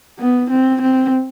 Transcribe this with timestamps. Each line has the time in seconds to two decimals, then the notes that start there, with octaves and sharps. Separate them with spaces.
0.19 B3
0.50 C4
0.81 C4